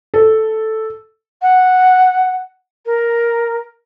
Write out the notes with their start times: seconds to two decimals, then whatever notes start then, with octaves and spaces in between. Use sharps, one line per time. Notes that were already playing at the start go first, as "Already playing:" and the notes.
0.14 A4
1.41 F#5
2.85 A#4